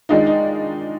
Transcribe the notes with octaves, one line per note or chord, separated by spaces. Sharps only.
D#3 G#3 D4 D#4 F4
D#4